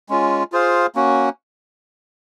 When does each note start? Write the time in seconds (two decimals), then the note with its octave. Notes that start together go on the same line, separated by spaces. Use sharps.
0.09 G#3 C#4 F4
0.52 F4 G#4 C5 F5
0.95 A#3 C#4 F#4